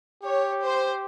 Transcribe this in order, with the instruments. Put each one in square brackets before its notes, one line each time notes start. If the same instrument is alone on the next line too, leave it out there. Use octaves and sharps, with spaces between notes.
[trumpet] G4 [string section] C#5
[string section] C5